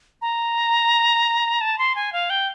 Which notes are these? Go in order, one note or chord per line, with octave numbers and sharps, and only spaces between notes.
A#5
A5
C6
G#5
F5
G5